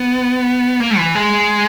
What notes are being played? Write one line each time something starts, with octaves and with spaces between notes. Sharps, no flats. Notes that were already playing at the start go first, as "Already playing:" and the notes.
Already playing: B3
A#3
E3
G#3